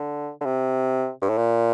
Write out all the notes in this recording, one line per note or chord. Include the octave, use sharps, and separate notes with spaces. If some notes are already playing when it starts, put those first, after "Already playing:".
Already playing: D3
D3
C3
G2
A2
A#2